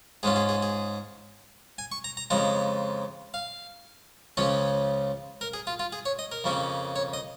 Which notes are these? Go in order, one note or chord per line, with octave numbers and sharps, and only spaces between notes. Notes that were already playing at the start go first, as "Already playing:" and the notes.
G#2 G#3 C#4 F4 G#4
G#4
G#4
G#4
G#5
C#6
A#5
A#5
F2 C#3 F3 G#3 A#5
F5
C#2 C#3 F3 C#4 C#5
A#4
G#4
F4
F4
G#4
C#5
D#5
A#4
F2 C#3 A#3 C#4
C#5
D#5